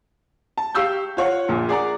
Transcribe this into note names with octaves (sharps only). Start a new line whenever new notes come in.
A5
G4 F5 C#6 E6 G6
F4 C#5 F#5
A#1 A#2
G#4 D5 F#5 A#5 D6